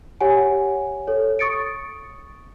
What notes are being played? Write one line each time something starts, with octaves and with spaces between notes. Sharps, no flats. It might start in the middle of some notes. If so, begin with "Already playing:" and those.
G4 C#5 F#5 G#5
A4 C#5
C#6 D#6 A6 C#7 D7